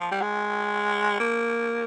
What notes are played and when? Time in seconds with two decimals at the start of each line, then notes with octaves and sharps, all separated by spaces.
0.01 F3
0.11 G3
0.22 G#3
1.20 A#3